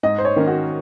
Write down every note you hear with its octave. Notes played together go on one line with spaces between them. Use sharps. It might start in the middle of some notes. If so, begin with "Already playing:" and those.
G#2 D#5
C5
C#5
D#3 A#3 C#4
F#4